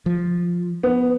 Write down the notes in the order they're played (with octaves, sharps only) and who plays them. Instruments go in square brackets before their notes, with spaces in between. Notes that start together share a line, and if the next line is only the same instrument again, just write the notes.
[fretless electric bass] F3
[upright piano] B3